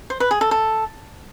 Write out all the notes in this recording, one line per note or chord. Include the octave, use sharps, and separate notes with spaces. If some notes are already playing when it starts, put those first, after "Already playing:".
C5
B4
G#4
A4
A4